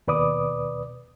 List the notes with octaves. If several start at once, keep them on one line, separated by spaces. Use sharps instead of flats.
D#2 B2 B4 D5 D6 D#6